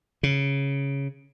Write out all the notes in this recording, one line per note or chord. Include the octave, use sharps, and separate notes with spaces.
C#3